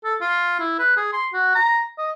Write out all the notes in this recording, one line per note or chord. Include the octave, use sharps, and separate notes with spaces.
A4
F4
E4
B4
G#4
C6
F#4
A#5
D#5